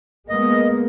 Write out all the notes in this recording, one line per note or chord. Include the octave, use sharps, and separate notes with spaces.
G#3 A#3 B3 D#5